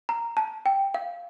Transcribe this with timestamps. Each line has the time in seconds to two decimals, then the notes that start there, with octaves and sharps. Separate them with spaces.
0.09 A#5
0.37 A5
0.66 G5
0.94 F5